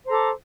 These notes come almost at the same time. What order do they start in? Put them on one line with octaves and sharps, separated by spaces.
C5 A#5 A4 D6